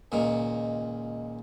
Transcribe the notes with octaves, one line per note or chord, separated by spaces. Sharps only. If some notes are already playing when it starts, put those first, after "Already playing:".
C#2 A#2 D#3